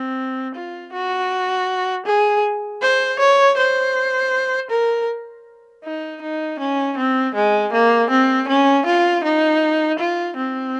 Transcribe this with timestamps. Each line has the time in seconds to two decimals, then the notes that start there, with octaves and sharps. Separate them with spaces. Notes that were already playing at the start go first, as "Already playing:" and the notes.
Already playing: C4
0.55 F4
0.92 F#4
2.06 G#4
2.82 C5
3.19 C#5
3.57 C5
4.70 A#4
5.84 D#4
6.22 D#4
6.59 C#4
6.97 C4
7.35 G#3
7.73 A#3
8.10 C4
8.48 C#4
8.86 F4
9.24 D#4
9.99 F4
10.37 C4